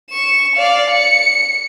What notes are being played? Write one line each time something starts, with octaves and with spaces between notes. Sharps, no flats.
C#6 E7
D5 F5
C#7